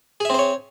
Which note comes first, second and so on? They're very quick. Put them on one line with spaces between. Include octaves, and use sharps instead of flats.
G#4 E5 C4 C5 C#5